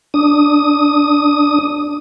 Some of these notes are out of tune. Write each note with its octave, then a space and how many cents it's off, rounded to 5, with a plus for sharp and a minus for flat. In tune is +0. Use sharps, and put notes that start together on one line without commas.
D4 +0 D#6 +0